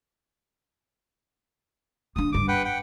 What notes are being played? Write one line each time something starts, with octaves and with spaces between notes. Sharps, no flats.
A#3 D4 D#6
G1 G2 D6
B4 F#5 G5
F#5 G5